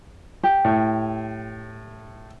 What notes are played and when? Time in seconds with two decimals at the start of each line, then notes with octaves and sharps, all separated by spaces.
0.43 G4
0.65 A2